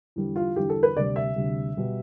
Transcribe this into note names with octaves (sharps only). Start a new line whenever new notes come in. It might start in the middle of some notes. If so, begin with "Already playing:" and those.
E2 D3 G3
F4
E2 D3 G3 G4
A4
B4
D2 C3 G3 D5
E5
D2 C3 G3
B2 G3